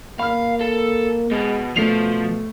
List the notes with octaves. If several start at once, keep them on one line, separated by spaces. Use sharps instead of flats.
A#3 F5 B5 F6
A4
B2 G#3
B2 F3 A3 C7 F7